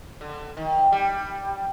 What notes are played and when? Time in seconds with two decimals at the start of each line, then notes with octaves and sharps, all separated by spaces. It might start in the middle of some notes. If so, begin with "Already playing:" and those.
0.21 D3
0.57 D#3
0.92 G3